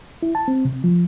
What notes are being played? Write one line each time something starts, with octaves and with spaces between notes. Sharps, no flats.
E4
A5
C4
C3
F3